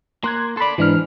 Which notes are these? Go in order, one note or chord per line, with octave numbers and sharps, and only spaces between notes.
A#3 C6 F#6 G#6
A4 D5 B5 C6
G#2 E3 D4 F6